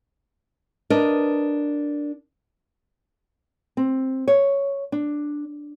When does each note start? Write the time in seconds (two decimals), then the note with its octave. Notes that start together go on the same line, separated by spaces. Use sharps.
0.90 D4 A#4 B4 D#5
3.77 C4
4.28 C#5
4.92 D4